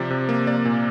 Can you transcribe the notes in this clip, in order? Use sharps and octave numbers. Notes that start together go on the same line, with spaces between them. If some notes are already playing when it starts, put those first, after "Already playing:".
Already playing: C3 F3 D5
C3
A#3
A#3 D5
A#2